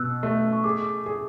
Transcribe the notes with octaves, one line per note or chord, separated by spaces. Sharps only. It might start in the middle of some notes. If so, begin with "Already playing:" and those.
Already playing: B2 E6 F#6
A3
C#6
G#4 D6
G#4